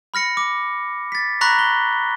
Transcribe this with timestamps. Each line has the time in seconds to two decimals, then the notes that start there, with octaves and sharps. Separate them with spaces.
0.14 B5 F6 A#6 C#7
0.37 D6
1.12 A6 B6
1.41 A#5 B5 C#6 F#6 A#6 B6
1.59 G7